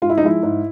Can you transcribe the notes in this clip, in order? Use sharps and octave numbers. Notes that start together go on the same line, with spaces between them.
G#2 F4
E4
D#4
F3 G#3 E4
G#2